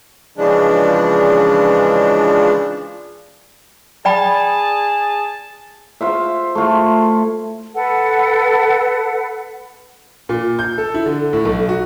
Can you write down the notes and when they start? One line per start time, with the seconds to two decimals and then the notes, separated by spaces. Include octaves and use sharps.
0.37 C#3 E3 F3 G#3 D4
4.05 G#4 D5 G5 A5 B5
6.01 F4 C5 E5
6.55 A3 E4 F4
7.75 A4 B4 F#5
10.29 A#2
10.59 G6
10.78 A4
10.94 E4
11.06 D3
11.33 A2
11.45 B1
11.69 F#4